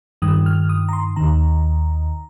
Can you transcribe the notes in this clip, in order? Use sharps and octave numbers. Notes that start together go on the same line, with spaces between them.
G2 D#3 D#6
F6
D#6
A#5
C6
D#2 D#3 A#5